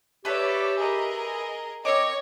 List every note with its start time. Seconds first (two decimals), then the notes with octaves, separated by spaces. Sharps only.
0.25 G4 A4 B4 C#5 D5 E5
0.78 G#4 A#4 D#5
1.85 C4 A#4 C#5 D#5 D6